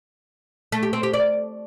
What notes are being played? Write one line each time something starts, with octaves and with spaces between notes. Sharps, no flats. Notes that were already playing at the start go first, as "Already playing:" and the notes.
A3
G4
C4
G4
D5